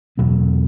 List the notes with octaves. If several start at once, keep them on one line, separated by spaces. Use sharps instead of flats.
E2 B2 F#3 B3